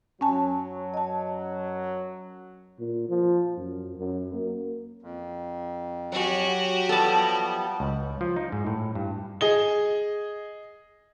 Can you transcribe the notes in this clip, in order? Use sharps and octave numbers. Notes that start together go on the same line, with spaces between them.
F#2 F#3 C#4 G#5 A5
D#5 A5
A#2
F3
F#2
F#2
A#3
F2
F#3 F#4 G4 F#5 G#5
F3 G3 B3 A4 A5
C#2
F3
D#4
G#2
A2
G2
G#4 D#5 G7